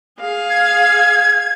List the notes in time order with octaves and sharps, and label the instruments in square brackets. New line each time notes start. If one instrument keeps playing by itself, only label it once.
[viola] G#4 F5
[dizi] G#6